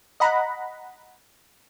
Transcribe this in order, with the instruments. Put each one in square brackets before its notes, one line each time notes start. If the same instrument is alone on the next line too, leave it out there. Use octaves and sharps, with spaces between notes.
[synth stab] D#5 F#5 A#5 B5